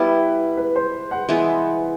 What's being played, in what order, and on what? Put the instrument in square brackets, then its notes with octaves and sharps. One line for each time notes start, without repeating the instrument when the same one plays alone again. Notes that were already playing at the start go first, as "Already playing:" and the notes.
Already playing: [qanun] G3 B3 E4 [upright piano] B4
[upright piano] B4
C5
F#5
[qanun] E3 G#3 B3